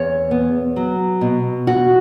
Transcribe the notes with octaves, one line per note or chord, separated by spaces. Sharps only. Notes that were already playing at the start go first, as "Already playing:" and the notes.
Already playing: E2 C#5
B3
F#3
B2
E2 F#4